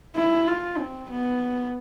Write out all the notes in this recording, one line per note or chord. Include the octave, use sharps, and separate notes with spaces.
E4
F4
C4
B3